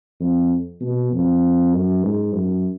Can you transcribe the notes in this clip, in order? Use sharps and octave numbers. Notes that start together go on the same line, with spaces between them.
F2
B2
F2
F#2
G#2
F#2